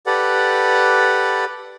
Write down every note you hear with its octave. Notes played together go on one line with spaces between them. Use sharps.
G4 A4 B4 D5 F#5